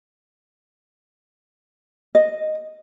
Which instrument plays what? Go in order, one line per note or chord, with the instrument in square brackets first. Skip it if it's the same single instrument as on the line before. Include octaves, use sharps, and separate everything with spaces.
[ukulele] D#5